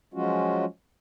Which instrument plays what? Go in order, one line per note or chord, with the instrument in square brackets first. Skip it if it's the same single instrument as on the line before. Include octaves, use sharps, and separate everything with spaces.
[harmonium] F3 F#3 G#3 C#4 F4 F#4